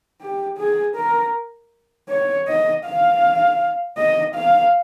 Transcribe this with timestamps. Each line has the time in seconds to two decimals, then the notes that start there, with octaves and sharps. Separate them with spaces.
0.21 G4
0.59 G#4
0.96 A#4
2.09 C#5
2.48 D#5
2.85 F5
3.98 D#5
4.35 F5